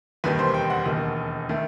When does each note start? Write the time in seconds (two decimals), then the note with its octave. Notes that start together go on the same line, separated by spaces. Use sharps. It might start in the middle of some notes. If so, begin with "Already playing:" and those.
0.24 E1 D#2 D#3 G3 B4
0.39 C5
0.54 G5
0.70 F#5
0.85 E1 D#2 D#3
1.49 D#3 A3